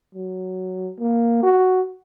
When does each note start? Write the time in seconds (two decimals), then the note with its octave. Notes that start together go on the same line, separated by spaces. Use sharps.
0.15 F#3
0.99 A#3
1.43 F#4